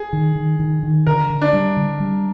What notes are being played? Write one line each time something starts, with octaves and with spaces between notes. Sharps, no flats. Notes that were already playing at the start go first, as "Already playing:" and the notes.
Already playing: G#4
D#3
D#3
D#3
D#3
D3 A#4
D3
D4
G3
D3
G3